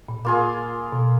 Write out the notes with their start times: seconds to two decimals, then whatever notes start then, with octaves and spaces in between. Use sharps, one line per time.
0.08 A#2
0.25 A#2 A#3 F4 G#4
0.92 B2